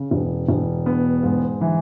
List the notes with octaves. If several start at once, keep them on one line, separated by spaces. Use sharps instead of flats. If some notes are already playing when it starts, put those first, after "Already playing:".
Already playing: C#3
E1
E1
B3
G#2
E3